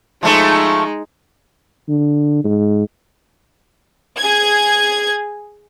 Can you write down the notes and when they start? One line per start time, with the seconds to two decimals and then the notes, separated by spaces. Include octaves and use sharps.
0.23 F3 G#3 A3 D#4
1.88 D3
2.45 G#2
4.19 G#4 G#6